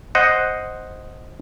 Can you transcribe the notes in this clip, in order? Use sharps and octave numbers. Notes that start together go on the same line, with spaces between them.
C5 D#5 F#5